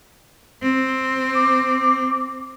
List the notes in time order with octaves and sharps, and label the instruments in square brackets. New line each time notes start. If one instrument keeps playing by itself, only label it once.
[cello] C4
[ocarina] D6